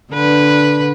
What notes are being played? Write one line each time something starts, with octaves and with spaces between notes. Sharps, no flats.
D3 B4